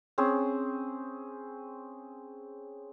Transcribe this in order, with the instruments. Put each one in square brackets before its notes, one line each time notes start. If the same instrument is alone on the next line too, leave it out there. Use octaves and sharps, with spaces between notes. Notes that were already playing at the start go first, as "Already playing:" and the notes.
[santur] C4 C#4 G#4